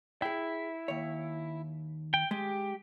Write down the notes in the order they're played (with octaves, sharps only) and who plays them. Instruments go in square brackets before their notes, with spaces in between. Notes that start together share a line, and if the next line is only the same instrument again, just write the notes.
[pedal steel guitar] E4 [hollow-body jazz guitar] G#4 G5
[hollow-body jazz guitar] D#2 C#5
[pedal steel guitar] G5
[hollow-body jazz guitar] G#3 [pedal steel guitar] G4